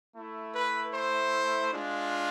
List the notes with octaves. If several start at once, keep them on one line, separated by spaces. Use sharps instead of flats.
A3 E4
B4
C5
G#3 D4 F4